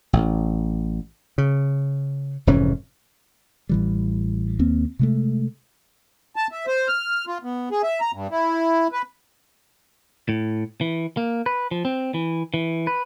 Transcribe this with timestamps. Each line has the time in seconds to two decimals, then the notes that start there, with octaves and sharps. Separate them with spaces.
0.13 A1
1.38 C#3
2.47 F1 G#2 E3 C#4
3.69 A1 E3 G3
4.59 D#2 A#3 C4
4.99 C3 G#3 A3
6.36 A5
6.52 E5
6.67 C5
6.88 F6
7.27 F4
7.43 B3
7.71 G#4
7.83 E5
8.01 A#5
8.13 G2
8.31 E4
8.92 B4
10.29 A2
10.81 E3
11.17 A#3
11.46 B4
11.71 F3
11.85 C4
12.14 E3
12.54 E3
12.87 B4